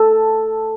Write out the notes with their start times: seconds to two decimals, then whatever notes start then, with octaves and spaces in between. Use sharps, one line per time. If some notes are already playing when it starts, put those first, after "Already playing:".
Already playing: A4